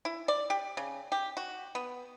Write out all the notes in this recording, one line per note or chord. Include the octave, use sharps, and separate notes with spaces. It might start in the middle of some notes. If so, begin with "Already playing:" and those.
E4
D5
G4
C#3
G4
F#4
B3